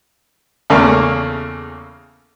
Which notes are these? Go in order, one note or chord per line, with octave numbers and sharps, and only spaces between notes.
E2 C#3 A3 A#3